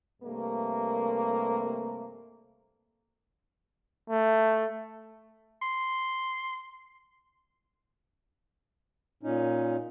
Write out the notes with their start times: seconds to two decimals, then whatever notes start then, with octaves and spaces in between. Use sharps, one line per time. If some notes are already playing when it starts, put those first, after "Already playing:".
0.23 G2 C3 A3 A#3
4.10 A3
5.61 C6
9.23 A#2 C#4 D#4